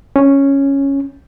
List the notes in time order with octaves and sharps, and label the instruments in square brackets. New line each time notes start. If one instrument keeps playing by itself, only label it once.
[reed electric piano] C#4